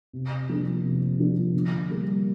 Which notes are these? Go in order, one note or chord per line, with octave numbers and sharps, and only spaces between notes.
C3
F3 A#3 D4
C3
F3 A#3 D4
D3
G3 A#3